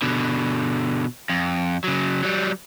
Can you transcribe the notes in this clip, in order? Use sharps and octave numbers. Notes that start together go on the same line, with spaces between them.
B2 D3
F2
C#3 F#3
F#3 G3